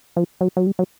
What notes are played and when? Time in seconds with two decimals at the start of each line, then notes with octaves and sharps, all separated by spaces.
0.16 F3
0.41 F#3
0.57 F#3
0.67 G3
0.79 F#3